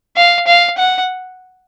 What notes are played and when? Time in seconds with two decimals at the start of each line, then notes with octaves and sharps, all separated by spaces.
0.16 F5
0.47 F5
0.78 F#5